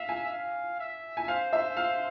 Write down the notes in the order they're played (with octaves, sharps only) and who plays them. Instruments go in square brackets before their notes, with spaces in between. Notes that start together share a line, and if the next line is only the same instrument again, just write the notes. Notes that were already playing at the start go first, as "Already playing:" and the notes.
Already playing: [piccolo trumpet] E5 [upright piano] F5
[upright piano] G#5
[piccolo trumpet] F5
E5
[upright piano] G#5
[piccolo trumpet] C5 [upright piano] F5
[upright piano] E5
F5